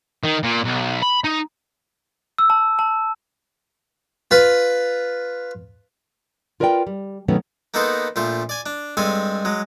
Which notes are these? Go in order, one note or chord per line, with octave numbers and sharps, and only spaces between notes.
D#3
A#2
B1
B5
D#4
E6
A5
A5
F4 B4
F4 A#4 B4 D5 D#5 G5
G3
B2 D#3 F#3 A3 B3 C#4
A#3 B3 D#4 A4 B4 C5
A#1 F3 A3 C5
D5 G#5
D4
G2 G#3 C4 A4 G#5
F#3 G#3